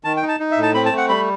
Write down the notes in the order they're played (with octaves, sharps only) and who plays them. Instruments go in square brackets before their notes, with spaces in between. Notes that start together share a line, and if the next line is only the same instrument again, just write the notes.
[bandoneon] D#3 A5
G5
D#4
A5
D#4
E5
A2
A5
C4 B5
A5
A3
F#5
G3 B5